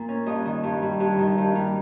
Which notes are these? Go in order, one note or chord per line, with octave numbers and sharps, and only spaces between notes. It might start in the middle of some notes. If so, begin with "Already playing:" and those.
Already playing: A#2 A#4
C#4
G2 D#5
D#3
G2
G3
G2
D#3
G2
G3